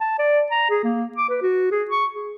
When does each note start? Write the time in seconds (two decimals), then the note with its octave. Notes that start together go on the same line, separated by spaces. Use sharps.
0.01 A5
0.19 D5
0.51 A#5
0.70 G#4
0.84 A#3
1.17 D6
1.29 B4
1.42 F#4
1.71 G#4
1.91 C#6
2.13 G#4